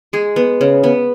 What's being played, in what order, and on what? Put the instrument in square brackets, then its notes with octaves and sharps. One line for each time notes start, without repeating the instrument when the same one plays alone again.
[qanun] G#3 G#4
B3
C#3
B3